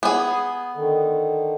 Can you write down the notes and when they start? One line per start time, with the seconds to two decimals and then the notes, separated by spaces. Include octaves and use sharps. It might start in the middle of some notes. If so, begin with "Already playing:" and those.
0.03 B3 G#4
0.74 D3 D#3